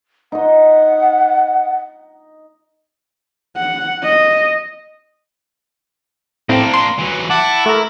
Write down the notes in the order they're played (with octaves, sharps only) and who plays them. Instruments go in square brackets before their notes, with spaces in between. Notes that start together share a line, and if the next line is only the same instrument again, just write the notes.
[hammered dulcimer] D#4 D#5 [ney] F#5
[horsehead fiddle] F#5
D#5
[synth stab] A2 C4 [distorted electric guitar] A#3 D4
[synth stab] C6
[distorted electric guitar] E3 F#3
[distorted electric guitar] E4 [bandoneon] F#5 A5 D6
[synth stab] A3 A#4